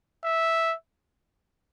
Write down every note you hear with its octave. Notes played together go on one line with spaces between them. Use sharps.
E5